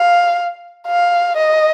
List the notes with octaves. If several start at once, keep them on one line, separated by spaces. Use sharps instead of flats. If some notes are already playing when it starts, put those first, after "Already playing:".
Already playing: F5
F5
D#5